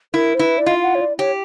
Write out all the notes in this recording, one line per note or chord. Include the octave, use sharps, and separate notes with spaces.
E4 A#4
C5
E4 B4
D5
F4 D#5
F5
F#5
C#5
D5
G4 C#5